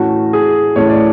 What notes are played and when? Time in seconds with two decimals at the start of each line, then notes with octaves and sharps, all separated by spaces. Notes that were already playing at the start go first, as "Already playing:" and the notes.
Already playing: A2 E3 A3 C#4 F#4
0.33 G#4
0.76 A2 E3 A3 C#4 C#5
0.89 D5